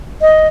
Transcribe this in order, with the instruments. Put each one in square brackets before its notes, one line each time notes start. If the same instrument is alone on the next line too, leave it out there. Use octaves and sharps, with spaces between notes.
[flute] D#5